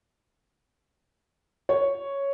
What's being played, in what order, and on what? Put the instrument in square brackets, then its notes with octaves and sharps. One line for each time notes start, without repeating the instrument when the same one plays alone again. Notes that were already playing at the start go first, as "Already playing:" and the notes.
[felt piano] C#5